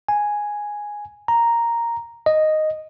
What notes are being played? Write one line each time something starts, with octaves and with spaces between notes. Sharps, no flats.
G#5
A#5
D#5